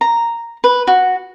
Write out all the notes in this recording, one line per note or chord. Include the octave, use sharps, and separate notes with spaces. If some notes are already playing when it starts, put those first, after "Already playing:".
A#5
B4
F#4